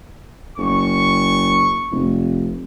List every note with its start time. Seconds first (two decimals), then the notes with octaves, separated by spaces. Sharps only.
0.58 F#1 C#6
1.92 F1